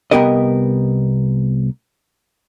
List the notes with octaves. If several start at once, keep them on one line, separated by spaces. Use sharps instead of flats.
C2 F#2 B3 G4 A#4 D#5